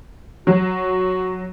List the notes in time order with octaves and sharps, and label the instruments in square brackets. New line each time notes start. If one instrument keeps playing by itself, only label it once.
[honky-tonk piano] F#3 [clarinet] F#4